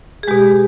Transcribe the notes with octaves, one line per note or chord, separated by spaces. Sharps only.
G#4
B2 G#3 G4